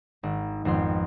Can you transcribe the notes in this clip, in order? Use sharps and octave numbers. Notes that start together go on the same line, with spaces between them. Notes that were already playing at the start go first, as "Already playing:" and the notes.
G#1
G#1 F2 B3 C6